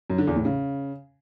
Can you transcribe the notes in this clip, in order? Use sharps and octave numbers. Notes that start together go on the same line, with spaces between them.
F#2
D3
E2
A2
C#3